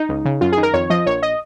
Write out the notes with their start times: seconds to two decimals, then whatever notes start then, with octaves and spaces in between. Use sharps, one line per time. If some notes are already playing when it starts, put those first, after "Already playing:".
Already playing: D#4
0.09 C#2
0.25 C#3
0.41 F#2 F4
0.52 G#4
0.57 D#3
0.63 A#4
0.74 F2 C#5
0.90 F3 D#5
1.06 A#1 C#5
1.22 D#5